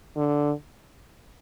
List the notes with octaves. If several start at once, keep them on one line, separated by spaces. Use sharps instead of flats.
D3